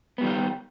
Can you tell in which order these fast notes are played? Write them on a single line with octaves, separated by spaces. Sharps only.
B3 G3 D#3 G4